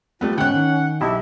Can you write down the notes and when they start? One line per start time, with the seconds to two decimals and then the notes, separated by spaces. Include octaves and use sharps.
0.21 G3 A3 B3 F4
0.38 G#2 D3 C#4 F#5 G5 F#6
0.54 D#3
1.01 B1 E4 G4